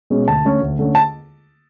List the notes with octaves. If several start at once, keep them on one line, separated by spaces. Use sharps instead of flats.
B2 G#3 C#4
D2 A5
D3 A3 C#4
D2
D3 A3 C#4
A5